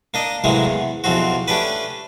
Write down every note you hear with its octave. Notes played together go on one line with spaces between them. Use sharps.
A#3 D4 D#5
A2 C3 E3 F#3 G#3 A#3
E2
B1 E2 F3 C4 F#4
A3 C#4 D4 G4 B4